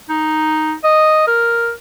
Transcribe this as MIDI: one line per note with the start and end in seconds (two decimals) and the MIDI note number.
0.09 0.74 63
0.84 1.23 75
1.27 1.71 70